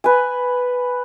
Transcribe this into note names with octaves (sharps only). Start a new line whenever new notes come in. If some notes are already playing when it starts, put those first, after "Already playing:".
B4 G#5